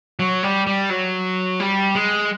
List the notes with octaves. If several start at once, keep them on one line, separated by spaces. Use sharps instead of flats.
F#3
G3
G3
F#3
G3
G#3